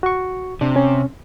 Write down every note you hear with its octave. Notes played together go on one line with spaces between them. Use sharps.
F#4 C#6
C3 D4
C#4